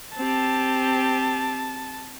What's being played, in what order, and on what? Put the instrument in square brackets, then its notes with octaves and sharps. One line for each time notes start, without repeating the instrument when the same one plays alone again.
[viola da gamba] C4 G4 [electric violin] A5